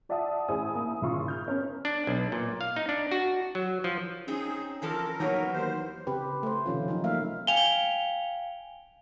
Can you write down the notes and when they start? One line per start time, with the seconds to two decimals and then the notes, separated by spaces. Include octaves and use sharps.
0.09 F4 D5 E5 F#5 A5 D#6
0.48 A1 E4 G#4 C5 G#5 D#6
0.75 A#3 E4
1.02 G#1 C#3 E4 F4 C6 C#6
1.28 F6 G6
1.46 B3 C#4 A#4
1.85 D4
2.07 B1
2.32 A#2
2.61 F5
2.76 D#4
2.89 D4
3.11 F#4
3.55 F#3
3.84 F3
4.28 C4 C#4 D#4 G#4
4.82 E3 F3 A4 A#4
5.20 E3 F#3 A#3 B3 D#4 C#5
5.53 D#2 C5
6.07 C#3 C4 G4 B4
6.43 A3 C5
6.66 C3 D#3 F3 C#4 F4
6.88 F3 F#3 D#4
7.04 A3 A#3 E5 F5
7.47 F5 G5 G#5 F7 G7